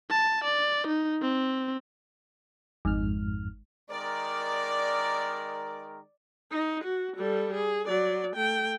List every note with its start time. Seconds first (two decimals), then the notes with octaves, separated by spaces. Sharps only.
0.10 A5
0.44 D5
0.87 D#4
1.22 C4
2.85 G#1 F2 G#2 F6
3.91 D#3 G#3 A#4 D5
6.52 D#4
6.84 F#4
7.17 G3 A4
7.54 G#4
7.87 F#3 D5
8.36 A3 G5